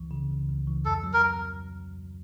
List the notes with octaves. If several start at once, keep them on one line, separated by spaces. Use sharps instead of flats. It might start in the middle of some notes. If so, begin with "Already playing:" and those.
Already playing: C#2 E3
C#3
C#2
C#2
E3
F2 A4
F#3
A#4